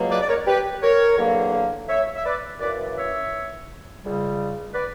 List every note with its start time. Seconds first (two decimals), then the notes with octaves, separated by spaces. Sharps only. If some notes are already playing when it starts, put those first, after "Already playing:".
Already playing: C#2 B2 F#3 A#3
0.11 B4 D5
0.21 D5
0.28 A#4 C#5
0.47 G4 B4
0.82 A#4 C#5
1.18 E2 D3 F#3 A#3
1.89 C#5 E5
2.15 E5
2.25 B4 D5
2.60 F#2 E3 A#3 B4 D5
2.97 C#5 E5
4.03 C#2 C#3 G3
4.74 B4 D5